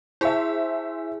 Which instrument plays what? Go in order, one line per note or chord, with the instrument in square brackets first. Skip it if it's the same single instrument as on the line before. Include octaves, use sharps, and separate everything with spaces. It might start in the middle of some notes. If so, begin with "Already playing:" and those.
[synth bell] E4 G#4 G#5 [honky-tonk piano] C5 E5